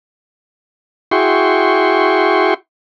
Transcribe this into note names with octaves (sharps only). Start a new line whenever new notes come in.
E4 F#4 G#4 G5 C6 C#6